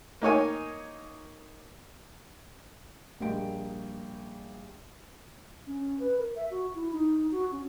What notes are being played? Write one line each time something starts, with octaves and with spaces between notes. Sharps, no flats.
A#3 D#4 C#5 G#5
A#1 G3 A#3 D#5 G5 D7
C#4
B4
A#4
E5
F#4
E4
D#4
F#4
C#4